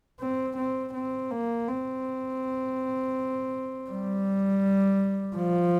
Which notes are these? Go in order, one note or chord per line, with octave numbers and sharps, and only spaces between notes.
C4
C4
C4
A#3
C4
G3
F3